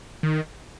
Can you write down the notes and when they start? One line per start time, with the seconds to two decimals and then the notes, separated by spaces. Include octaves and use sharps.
0.23 D#3